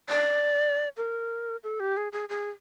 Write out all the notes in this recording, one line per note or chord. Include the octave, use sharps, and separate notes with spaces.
D5
A#4
A4
G4
G#4
G#4
G#4